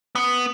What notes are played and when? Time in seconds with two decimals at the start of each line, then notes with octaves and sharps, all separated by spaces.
0.15 B3